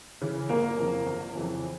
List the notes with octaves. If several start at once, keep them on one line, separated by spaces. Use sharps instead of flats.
C#3 E3
G1 A#3 A#4
F2 C#3 E3
G1
F2 C#3 E3